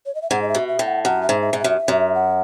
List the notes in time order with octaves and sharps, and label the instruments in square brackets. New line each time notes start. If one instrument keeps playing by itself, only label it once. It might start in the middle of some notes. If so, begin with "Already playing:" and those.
[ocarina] C#5
D#5
E5
[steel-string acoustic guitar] G#2 [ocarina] F#5
[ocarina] D#5
E5
[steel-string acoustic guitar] B2
[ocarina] E5
[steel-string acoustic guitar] A2
[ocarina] F#5
[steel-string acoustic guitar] F#2 [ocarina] F#5
[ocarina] E5
[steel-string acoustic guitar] G#2
[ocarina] E5
[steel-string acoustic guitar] G#2
[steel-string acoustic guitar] F#2 [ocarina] E5
[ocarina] E5
[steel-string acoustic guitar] F#2
[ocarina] F#5